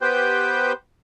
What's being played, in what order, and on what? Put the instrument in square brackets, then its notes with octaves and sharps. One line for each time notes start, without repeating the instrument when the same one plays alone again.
[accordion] B3 G4 B4 C5 G5 G6